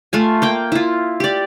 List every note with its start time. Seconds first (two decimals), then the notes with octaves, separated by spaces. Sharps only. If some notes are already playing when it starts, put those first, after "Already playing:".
0.13 A3 F4 G#5
0.42 A#3 G5 D6
0.72 E4 F4
1.20 G4 D5